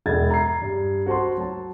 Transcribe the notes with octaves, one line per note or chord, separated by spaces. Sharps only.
E1 E5 G#6 A6
A#5 G#6 C7
G2
F#4 C5 A5 C6
F#3 A5